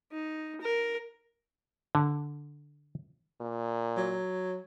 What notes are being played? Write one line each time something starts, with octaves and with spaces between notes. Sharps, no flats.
D#4
A#4
D3
A#2
F#3